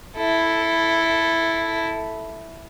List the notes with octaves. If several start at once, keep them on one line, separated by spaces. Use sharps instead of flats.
E4 A4